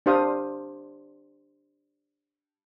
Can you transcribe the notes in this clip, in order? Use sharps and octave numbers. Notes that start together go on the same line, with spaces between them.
D4 G4 C5 F5 D#6